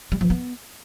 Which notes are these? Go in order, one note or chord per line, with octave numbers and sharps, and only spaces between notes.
G3
F3
B3